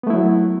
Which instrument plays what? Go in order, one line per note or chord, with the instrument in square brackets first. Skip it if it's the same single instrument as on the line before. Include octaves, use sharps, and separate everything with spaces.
[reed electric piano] B3
A3
E4
F#3